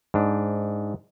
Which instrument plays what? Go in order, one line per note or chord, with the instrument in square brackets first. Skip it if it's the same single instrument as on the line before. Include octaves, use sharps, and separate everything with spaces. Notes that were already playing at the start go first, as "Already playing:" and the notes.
[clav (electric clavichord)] G#2 D4